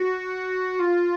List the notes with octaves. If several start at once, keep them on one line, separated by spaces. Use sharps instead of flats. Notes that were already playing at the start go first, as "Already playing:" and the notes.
Already playing: F#4
F4